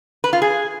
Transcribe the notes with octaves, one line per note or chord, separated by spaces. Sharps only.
B4
F4
G#4